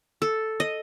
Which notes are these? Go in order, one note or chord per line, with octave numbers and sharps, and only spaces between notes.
A4
D#5